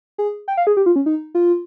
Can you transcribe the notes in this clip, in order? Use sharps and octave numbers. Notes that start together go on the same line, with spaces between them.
G#4
G5
F5
G#4
G4
F4
C#4
D#4
F4